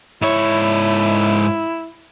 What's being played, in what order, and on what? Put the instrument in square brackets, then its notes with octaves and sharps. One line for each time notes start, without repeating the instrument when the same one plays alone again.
[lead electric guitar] G#2 C#5 [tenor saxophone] E4